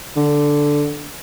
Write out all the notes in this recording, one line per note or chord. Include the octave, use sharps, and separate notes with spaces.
D3